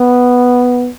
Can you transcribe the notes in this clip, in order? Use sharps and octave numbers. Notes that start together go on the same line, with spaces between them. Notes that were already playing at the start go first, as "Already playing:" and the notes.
Already playing: B3